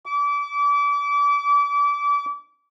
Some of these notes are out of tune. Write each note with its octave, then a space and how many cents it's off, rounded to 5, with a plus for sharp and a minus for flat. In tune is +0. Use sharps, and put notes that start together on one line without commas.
D6 -30